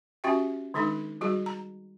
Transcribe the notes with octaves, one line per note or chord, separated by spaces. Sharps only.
C#4 F#4 G4 E5 G5
D#3 G#3 D4 D#4 A4
G3 F#4 G#4
A#5